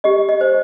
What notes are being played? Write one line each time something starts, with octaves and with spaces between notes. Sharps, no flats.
G4 D#5
D#5
C5